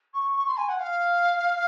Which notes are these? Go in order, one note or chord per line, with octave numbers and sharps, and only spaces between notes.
C#6
C#6
C6
G#5
F#5
F5